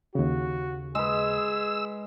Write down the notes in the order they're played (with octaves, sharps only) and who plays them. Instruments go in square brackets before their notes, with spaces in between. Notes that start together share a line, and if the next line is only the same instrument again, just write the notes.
[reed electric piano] D#2 C#3 [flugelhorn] F#4
[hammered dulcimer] G#3 B4 [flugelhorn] G#4 [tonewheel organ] E6